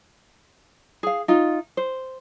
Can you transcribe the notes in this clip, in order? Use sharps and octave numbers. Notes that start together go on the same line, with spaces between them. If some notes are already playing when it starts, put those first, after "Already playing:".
G#4 F5
D#4 F4
C5